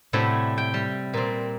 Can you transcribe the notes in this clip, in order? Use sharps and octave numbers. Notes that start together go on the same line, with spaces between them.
A2 C3 G3 E4 F#4
G5
G3
A#2 C4